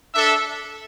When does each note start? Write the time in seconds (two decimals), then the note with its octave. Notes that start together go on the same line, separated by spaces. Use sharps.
0.14 D4 A4 E5